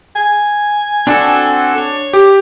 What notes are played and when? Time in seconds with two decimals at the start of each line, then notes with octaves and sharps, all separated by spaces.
0.16 G#5
1.07 C4 D4 F#4 A4
1.78 C#5
2.13 G4